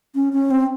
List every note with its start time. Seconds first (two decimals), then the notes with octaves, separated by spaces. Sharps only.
0.15 C#4
0.33 C#4
0.51 C4